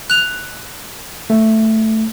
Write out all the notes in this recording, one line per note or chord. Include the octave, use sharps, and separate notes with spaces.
F#6 F7
A3